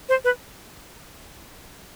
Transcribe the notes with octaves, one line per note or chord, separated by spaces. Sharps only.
C5
B4